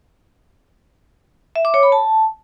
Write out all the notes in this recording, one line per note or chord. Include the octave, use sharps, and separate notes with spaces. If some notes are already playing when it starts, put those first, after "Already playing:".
E5
D6
C#5
B5
A5